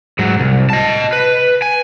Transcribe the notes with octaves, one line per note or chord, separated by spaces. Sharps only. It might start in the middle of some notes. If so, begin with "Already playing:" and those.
G#2 F#3
C2
D#5 A5
B4
G#5